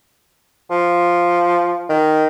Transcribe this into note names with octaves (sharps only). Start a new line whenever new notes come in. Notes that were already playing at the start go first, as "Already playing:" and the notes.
F3
D#3